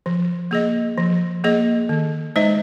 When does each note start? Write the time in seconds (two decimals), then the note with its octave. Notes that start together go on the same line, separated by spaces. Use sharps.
0.06 F3
0.51 A#3 G#4 D#5
0.98 F3
1.44 A#3 G#4 D#5
1.89 D#3
2.36 G#3 D#4 C5 D#5